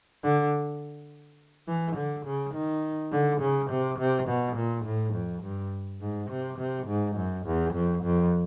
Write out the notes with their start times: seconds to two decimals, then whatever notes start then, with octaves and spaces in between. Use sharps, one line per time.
0.24 D3
1.68 E3
1.96 D3
2.26 C#3
2.54 D#3
3.12 D3
3.41 C#3
3.70 C3
3.99 C3
4.28 B2
4.56 A#2
4.85 A2
5.14 F2
5.43 G2
6.01 G#2
6.30 C3
6.58 C3
6.87 G#2
7.16 F#2
7.46 E2
7.74 F2
8.03 F2